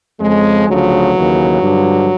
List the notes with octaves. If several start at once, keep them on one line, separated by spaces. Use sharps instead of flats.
F2 C#3 F3 G#3
D2 C#3 F3 F#3
D#2 C#3 E3
G2 D3 F3